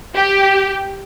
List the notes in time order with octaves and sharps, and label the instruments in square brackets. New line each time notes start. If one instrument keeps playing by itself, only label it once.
[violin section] G4